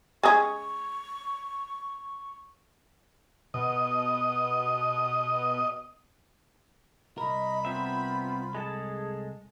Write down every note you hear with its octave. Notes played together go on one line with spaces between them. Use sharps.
G#3 C#4 G#5 C#6 D#6 G#6
B2 D#5
C2 A#4 D#5 B5
B3 C4 F4 E5
G#3 G#4 A4 A5